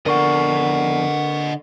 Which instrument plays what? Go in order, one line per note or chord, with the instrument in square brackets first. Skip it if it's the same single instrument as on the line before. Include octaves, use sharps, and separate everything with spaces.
[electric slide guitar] F2 B3 D5 [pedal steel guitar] D3 [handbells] A#4 C#6 [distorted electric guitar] D#5 F#5